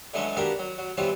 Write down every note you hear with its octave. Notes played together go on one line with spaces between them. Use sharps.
D3 E3 F#3 G#3 A3 C#4
A#3 B3 D4 F#4 G4 A#4
F#3
F#3
E3 F#3 G3 B3 C4 F4